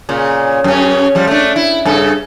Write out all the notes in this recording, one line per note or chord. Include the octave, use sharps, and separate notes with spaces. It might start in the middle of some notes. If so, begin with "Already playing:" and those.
A#2 C#3
F#2 C#4
F3 G3
A3 D4
E4
G2 C#3 A4